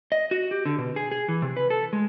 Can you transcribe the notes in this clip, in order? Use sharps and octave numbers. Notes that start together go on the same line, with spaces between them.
D#5
F#4
G4
D3
B2
G#4
G#4
E3
C3
B4
A4
G#3